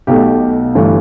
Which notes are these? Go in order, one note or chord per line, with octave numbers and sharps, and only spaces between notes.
B1 B2 A3 G4
G1 G2 E3 A3